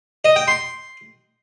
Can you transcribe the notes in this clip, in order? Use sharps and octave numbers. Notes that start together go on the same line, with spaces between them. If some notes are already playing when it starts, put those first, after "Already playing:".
D#5
G5
C6